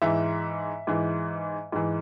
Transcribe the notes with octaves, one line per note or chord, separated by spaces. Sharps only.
G#2 E3 E5
G#2 E3
G#2 E3